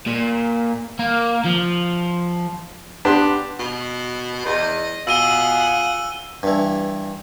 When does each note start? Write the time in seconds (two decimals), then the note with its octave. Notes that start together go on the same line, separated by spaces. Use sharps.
0.06 A#2
0.99 A#3
1.45 F3
3.05 B3 D4 G4 C6
3.59 B2
4.45 E2 D#5
5.07 B2 F4 G#4 F#5 E6 D#7 G7
6.43 G2 E3